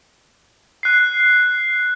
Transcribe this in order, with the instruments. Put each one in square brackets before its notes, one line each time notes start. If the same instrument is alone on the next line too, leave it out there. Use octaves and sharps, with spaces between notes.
[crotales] F#6 C7